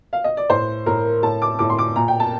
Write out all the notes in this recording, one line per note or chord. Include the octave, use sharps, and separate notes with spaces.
F5
D#5
D5
A2 C5
A2 A#4
A2 A5
D6
A2 D6
C6
D6
A#2 A#5
G5
A5